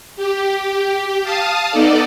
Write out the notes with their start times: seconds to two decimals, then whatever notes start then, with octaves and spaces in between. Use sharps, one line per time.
0.17 G4
1.23 F5 A5 D#6
1.70 B3 D#4 A4 D5